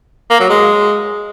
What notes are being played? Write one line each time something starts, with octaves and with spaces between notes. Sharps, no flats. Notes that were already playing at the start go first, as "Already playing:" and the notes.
A#3
F#3
G#3